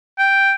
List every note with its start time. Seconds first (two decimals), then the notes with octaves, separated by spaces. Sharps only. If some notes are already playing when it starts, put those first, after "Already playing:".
0.18 G5